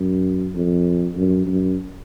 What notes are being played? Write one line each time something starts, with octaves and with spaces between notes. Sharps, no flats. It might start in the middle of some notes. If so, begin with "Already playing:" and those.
Already playing: F#2
F2
F#2
F#2